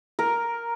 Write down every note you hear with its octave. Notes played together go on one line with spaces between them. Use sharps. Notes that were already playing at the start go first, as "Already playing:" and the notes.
A#4